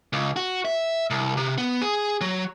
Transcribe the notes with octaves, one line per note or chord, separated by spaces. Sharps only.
C#2
F#4
E5
C2
C3
B3
G#4
F#3